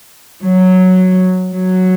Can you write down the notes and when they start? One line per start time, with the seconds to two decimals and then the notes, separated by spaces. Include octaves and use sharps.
0.42 F#3
1.53 F#3